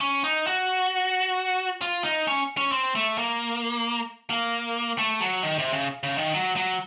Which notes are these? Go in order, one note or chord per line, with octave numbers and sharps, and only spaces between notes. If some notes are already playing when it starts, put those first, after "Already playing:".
C#4
D#4
F#4
F4
D#4
C#4
C#4
C4
A3
A#3
A#3
A3
F#3
D#3
C3
C#3
C#3
D#3
F#3
F#3